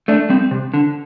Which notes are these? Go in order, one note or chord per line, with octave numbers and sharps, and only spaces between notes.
A3 D4
G3 C4
C3
D3